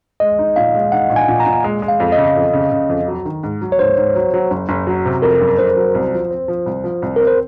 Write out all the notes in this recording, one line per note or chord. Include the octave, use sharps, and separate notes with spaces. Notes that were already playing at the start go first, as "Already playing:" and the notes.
G#3 D#5
D#4
A#2 F5
G#3
D#4 F#5
A#1
G#5
A#2
A#5
A#2
G#3
G#3
F5
F2
D#5
C#3
F2
C#3
C#3
F2
F#3
D#3
G#2
F#3
C#5
G#2 C5
G#2
F#3
F#3
F#1
F#1
F#3
C3
F2 A#4
F#1
F#1 C5
F#3
C2
F3
C4
F3
C2
F3
C2
C4 A#4
C5